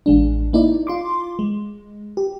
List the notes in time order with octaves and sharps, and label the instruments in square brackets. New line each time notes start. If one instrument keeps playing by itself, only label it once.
[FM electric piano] A1 G#3 D4
A#3 D#4 E4 D5
F4 C6 D6
G#3
G4